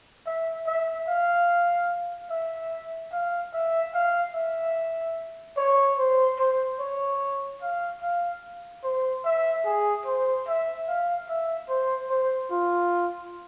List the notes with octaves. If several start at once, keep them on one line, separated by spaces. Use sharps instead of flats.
E5
E5
F5
E5
F5
E5
F5
E5
C#5
C5
C5
C#5
F5
F5
C5
E5
G#4
C5
E5
F5
E5
C5
C5
F4